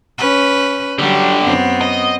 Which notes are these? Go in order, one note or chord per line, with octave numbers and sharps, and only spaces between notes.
C#4 B4
D3 F#3 G3 G4
F#2 B3 C4
D#5